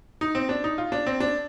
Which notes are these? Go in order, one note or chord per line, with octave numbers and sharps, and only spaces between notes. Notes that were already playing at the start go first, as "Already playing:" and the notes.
D#4
C4
D4
D#4
F4
D4
C4
D4